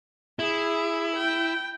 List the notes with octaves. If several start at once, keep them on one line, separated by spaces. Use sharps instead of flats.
E4 G#4
G5